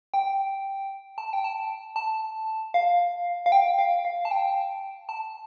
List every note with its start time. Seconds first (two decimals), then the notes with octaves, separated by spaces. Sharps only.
0.14 G5
1.18 A5
1.33 G5
1.44 A5
1.96 A5
2.74 F5
3.46 F5
3.52 G5
3.79 F5
4.05 F5
4.25 A5
4.31 G5
5.09 A5